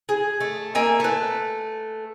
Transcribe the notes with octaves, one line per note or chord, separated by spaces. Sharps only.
G#4
A3
A#3 E5 G#5
A3 B4